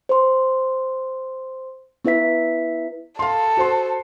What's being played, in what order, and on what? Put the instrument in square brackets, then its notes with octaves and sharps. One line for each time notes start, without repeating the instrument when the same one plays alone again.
[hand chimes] C5 C6
B3 E4 B4 E5 B6
[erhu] A4 [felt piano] F5 C6
[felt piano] F#4 C5 C6